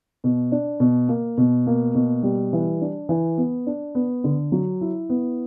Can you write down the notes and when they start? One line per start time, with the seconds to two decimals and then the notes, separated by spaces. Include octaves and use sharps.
0.24 B2
0.52 D4
0.80 B2
1.09 A#3
1.38 B2
1.67 A#3
1.95 B2
2.23 G3
2.53 E3
2.81 D4
3.09 E3
3.38 B3
3.66 D4
3.95 B3
4.24 D3
4.52 F#3
4.81 E4
5.09 B3